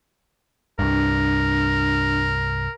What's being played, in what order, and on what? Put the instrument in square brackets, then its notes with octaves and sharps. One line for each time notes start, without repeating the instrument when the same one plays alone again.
[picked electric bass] C2 G2 [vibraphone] D4 [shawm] A#4